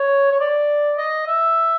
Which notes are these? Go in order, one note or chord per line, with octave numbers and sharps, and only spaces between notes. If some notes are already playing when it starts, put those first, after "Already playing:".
Already playing: C#5
C#5
D5
D#5
E5